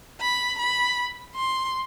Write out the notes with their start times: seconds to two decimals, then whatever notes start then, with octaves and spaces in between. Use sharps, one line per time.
0.21 B5
0.59 B5
1.36 C6